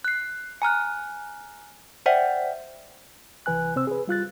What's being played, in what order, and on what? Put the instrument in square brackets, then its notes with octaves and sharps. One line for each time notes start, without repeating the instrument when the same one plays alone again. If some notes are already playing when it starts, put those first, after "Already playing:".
[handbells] F#6 C7
G#5 A#5 F6 F#6
C5 D5 E5 F#5 G5
[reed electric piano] C2 E3 B4 G#5 F#6
C3 C4 C5 E6
G#4 B4
G3 F4 F#6 A6